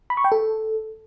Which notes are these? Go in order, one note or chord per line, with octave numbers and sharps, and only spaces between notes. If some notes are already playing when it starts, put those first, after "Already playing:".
B5
C#6
G5
A4